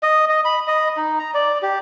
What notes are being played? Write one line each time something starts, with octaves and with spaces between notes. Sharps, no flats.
D#5
D#5
B5
D#5
D#4
A#5
D5
G4